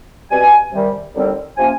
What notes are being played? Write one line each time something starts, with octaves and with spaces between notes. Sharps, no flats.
B2 G3 C4 G#5
C3 D#3 G3
D#2 D3 G3 C4
C3 F3 A#3 C#4 G#5